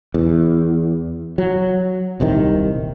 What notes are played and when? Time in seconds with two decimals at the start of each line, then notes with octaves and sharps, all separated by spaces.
0.14 E2
1.38 F#3
2.20 D#1 C2 C3 D#3